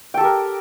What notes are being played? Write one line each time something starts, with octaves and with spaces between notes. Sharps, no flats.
G4 A4 A#4 G5